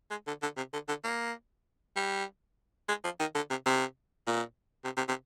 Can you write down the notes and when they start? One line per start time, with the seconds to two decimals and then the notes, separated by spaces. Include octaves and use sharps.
0.11 G#3
0.27 D3
0.43 D3
0.57 C3
0.73 D3
0.88 D3
1.04 A#3
1.96 G3
2.88 G#3
3.04 F3
3.20 D#3
3.35 D3
3.50 C3
3.66 C3
4.27 A#2
4.84 C3
4.97 C3
5.08 C3